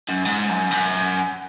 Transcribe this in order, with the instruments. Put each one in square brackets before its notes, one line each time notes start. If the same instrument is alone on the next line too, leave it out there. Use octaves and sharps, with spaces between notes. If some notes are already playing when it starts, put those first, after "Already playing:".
[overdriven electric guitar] F#2
G#2
F#2
G#2
F#2